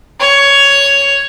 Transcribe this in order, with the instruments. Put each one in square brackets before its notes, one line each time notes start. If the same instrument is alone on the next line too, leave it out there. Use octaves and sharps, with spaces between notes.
[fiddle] C#5